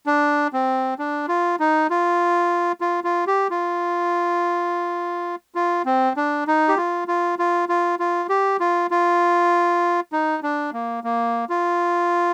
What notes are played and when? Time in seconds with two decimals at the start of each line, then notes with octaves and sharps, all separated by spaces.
0.06 D4
0.53 C4
0.99 D4
1.28 F4
1.60 D#4
1.90 F4
2.81 F4
3.04 F4
3.27 G4
3.50 F4
5.55 F4
5.86 C4
6.17 D4
6.47 D#4
6.68 G4
6.77 F4
7.08 F4
7.39 F4
7.69 F4
7.99 F4
8.29 G4
8.60 F4
8.91 F4
10.13 D#4
10.43 D4
10.73 A#3
11.04 A#3
11.50 F4